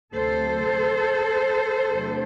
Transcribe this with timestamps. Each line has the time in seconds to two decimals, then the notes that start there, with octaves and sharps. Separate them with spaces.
0.14 D2 C3 F#3 A4 C5
1.91 E2 C3 F#3 A3 D4